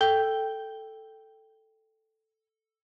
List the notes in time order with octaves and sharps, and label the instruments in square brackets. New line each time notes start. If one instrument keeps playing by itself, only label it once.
[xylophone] A4 G5 G6 G7